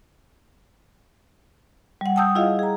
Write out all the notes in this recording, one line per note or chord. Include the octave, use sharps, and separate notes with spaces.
G3 F#5
G5 A5 D#6 E6 G6
E4 F4 G#4 D#5 F5
G#4 A#5